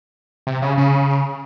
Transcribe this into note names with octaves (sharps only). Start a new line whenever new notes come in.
C3
C#3
C#3